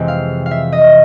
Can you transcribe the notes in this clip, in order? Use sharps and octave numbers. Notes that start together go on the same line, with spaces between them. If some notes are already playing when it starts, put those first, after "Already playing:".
Already playing: F2 C3 E3 G#3 C4
F5
F5
E5
D#5